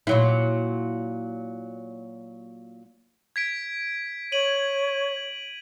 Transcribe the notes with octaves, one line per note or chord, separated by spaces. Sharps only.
A#2 F#3 E4
G#6 B6 D7
C#5 D#7 F#7